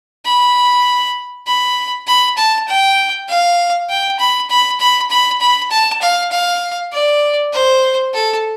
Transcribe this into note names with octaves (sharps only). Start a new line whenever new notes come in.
B5
B5
B5
A5
G5
F5
G5
B5
B5
B5
B5
B5
A5
F5
F5
D5
C5
A4